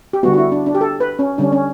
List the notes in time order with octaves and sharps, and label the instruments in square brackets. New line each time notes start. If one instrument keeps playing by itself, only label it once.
[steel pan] G4
D3 G3 B3 F#4
F#4
E4
D4
D4
G4
A4
B4
C#4
D3 G3 C#4 D4
C#4